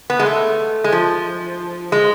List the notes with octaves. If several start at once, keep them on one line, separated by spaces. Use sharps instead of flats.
B3
G#3
A3
G#3
F3
G#3